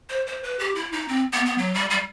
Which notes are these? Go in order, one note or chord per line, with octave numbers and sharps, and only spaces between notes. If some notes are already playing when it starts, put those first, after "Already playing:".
C5
C5
B4
G4
E4
D#4
C4
B3
B3
F#3
G3
G3